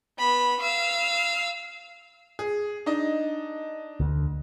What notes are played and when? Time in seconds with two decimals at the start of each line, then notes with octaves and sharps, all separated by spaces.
0.19 B3 B5
0.60 F5 E6
2.39 G#4
2.86 D4 D#4 D#5
4.00 D2